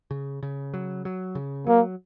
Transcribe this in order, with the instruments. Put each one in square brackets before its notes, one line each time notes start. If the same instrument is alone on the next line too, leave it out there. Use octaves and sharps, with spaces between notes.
[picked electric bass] C#3
C#3
F#3
F#3
C#3
[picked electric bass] F#3 [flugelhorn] A#3